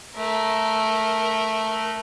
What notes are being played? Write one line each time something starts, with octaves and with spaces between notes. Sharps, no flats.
A3 A#4